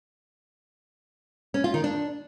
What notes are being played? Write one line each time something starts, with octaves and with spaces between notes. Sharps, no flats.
C#4
F4
D#3
D4